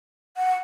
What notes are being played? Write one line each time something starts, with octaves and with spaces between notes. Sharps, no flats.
F#5